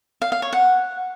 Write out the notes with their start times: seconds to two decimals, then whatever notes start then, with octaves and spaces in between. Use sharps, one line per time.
0.22 F5
0.32 F5
0.42 C#5
0.53 F#5